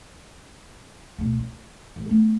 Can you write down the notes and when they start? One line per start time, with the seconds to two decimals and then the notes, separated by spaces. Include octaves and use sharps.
1.18 D1 B2
1.39 F4
1.96 A1
2.09 A3 B3